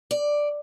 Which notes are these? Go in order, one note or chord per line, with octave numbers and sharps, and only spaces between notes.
D5